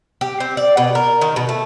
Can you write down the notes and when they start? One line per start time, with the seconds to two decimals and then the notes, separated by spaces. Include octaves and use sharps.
0.21 G4
0.40 C4
0.57 D5
0.77 B2
0.95 A#4
1.21 D#3
1.36 B2
1.49 A3